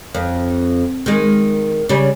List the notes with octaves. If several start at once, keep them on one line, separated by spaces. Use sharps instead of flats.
F2
D#3 G#3
C#3 G3